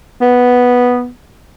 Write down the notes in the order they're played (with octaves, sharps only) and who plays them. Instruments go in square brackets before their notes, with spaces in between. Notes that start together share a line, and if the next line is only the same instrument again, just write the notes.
[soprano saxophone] B3